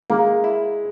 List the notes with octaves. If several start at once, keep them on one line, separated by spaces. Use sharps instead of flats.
G#3 A#3
E4